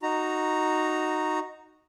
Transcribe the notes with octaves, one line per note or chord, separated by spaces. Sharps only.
D#4 F#4 A#5